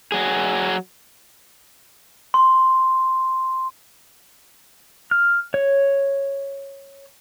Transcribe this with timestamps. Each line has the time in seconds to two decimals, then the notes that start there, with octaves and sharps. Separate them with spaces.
0.12 F#3 G#4
2.34 C6
5.11 F6
5.54 C#5